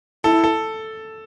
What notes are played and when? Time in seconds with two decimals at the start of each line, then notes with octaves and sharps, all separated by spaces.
0.24 E4 A4
0.44 A4